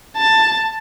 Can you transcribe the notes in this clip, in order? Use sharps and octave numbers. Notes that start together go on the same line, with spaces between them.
A5